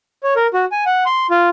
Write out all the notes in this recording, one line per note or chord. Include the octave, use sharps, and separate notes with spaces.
C#5
A#4
F#4
G#5
F#5
C6
F4